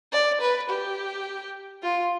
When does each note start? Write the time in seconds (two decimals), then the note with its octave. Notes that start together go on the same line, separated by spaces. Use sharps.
0.12 D5
0.41 B4
0.69 G4
1.82 F4